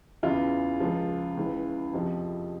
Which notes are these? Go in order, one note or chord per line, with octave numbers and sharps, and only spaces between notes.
E2 C#3 E3 F4
C#2 C#3 F3
C#2 C#3 E3
F2 C3 F3